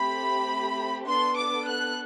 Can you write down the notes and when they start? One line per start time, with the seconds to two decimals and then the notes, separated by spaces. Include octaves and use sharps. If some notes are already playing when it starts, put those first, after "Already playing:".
Already playing: A3 C4 G4 B5
1.07 B3 D4 A4 C6
1.38 D6
1.67 F#6